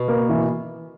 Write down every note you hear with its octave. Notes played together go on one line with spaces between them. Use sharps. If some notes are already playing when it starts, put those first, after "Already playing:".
Already playing: B2
A#3
E3